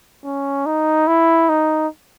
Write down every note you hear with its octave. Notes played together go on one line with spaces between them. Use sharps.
C#4
D#4
E4
D#4